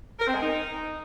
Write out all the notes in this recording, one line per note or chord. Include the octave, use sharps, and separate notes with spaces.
A#4
C4
G#3
D#4